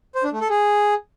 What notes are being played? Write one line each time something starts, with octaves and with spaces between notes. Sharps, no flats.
C5
D4
A3
A4
G#4